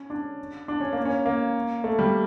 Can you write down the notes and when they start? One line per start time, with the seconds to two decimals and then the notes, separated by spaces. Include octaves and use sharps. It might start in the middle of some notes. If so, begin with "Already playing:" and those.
Already playing: C#4
0.10 D4
0.68 D4
0.80 C#4
0.93 A#3
1.05 C#4
1.26 A#3
1.84 A3
1.99 G3